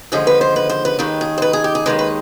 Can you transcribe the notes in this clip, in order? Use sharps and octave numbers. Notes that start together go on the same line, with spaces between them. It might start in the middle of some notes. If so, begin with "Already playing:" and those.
D#2 D3 F3 G#3 G#4
B4
C5
B4
C5
B4
D#2 D#3 G#3 B4
G#4
C5
B4
G#4
G4
G#4
D#2 D#3 G#3 B4
B4